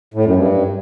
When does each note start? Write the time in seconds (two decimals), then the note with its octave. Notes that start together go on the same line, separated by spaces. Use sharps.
0.14 A2
0.25 F#2
0.36 G2